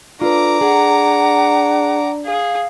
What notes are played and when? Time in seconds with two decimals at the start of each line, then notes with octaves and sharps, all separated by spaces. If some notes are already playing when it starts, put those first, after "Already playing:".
0.21 D4 F4 A4 B4 A#5 D6
0.61 G#4 F#5
2.26 G#4 F5